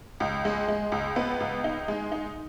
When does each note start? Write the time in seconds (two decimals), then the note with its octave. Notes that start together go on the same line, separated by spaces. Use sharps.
0.20 C#2
0.45 G#3
0.68 G#3
0.92 C#2
1.16 B3
1.40 C#2
1.64 D#4
1.88 G#3
2.12 D#4